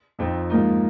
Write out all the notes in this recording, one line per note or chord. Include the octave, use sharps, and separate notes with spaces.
F2 F3 C4 D#4
G#2 F3 A#3 D#4